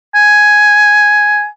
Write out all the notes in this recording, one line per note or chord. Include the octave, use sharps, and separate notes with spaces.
G#5